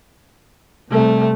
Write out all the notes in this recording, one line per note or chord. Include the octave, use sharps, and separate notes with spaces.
C3 G3 A3